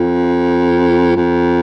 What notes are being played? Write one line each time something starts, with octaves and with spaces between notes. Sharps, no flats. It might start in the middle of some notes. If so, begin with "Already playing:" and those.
Already playing: F2
F2